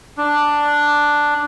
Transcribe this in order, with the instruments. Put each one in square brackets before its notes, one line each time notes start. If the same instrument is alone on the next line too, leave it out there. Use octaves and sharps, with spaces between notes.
[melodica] D4